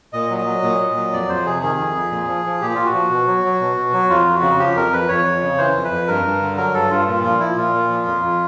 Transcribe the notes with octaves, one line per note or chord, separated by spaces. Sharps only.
A#2 D#5
F#3
D#5
F#3
A#2
A#2
F#3
F2 D5
F2 C5
C3 G#4
D#3 G#4
F2
F2
A#2
F3
F3
A#2 G4
A#2 F4
F#4
F3
B2
F#3
F#3
B2
B2
F#3
F2 F4
F2
F#4
C#3
F3 G4
F2 A#4
F2 B4
F2 C#5
F2
C#3
E3 C5
F2
B4
F2
G2 A#4
G2
D3
F#3 A#4
G2 A4
G2 F4
A#2 F4
F3 F4
F3 E4
A#2 F4
A#2
F3
F2
F2